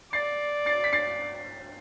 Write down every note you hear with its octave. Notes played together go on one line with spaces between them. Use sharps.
D5 A6 C7
A6 C7
B6
A6 C7